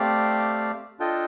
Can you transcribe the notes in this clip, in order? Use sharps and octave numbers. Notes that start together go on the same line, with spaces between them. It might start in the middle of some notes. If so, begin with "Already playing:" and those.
Already playing: A3 C4 G4 D5 F5
D4 F4 A4 D#5 G5